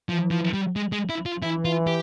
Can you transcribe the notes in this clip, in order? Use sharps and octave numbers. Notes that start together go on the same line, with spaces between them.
E3 F3
F3
G3
G#3
G#3
E4
F4
E3 E4
F4
G4